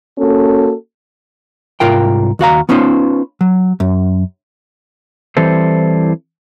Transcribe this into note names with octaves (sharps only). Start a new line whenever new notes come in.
A#3 C#4 F#4 A4
C2 G#2 F4 A#4 G5
D#2 F#4 F5 A#5
B3 C#4 D#4 F4 B4 C5
F#3
F#2
E3 G3 C4 E4 A4 C5